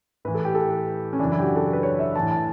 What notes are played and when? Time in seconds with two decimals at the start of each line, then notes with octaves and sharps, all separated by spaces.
0.25 A2 E3 B4
0.35 A4
0.45 G4
0.55 A4
1.13 C#4
1.19 F#2 C#3 E3 D4
1.32 E4
1.39 G4
1.44 F#4
1.56 A4
1.73 B4
1.83 C#5
1.99 E5
2.15 A2 E3 A5
2.31 A5